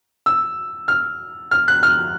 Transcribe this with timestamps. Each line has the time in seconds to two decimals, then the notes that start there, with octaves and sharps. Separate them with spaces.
0.26 E6
0.88 F6
1.51 F6
1.68 F#6
1.83 F6